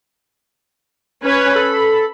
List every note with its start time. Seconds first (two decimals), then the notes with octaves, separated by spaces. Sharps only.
1.23 C#4 B4 C#5
1.56 A4 B5